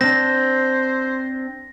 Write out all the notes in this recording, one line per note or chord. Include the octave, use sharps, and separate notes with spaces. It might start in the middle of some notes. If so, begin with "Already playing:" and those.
C4 D4 C5 A#6